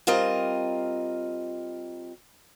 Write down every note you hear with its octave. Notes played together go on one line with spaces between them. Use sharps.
G3 C4 F4 A#4 D#5